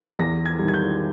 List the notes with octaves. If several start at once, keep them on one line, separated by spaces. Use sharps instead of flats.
E2 A#6
G#6
D#3 G3
G#6
G6